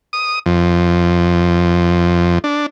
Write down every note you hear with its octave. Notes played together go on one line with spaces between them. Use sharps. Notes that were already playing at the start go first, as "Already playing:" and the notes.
D#6
F2
D4